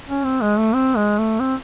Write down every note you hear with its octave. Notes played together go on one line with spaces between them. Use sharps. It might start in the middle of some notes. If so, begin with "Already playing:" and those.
C#4
C4
G#3
A3
C4
G#3
A3
C4